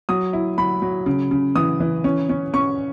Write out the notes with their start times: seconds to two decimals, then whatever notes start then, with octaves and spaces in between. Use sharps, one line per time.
0.09 F#3 D#6
0.33 E4
0.58 F#3 B5
0.82 F#3
1.06 C#3
1.31 C#3
1.56 E3 D#6
1.80 E3
2.04 C#4
2.29 C#4
2.53 C#4 C#6